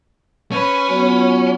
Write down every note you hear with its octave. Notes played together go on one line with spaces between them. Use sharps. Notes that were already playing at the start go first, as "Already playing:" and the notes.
C#4 B4
F#3 B3 F4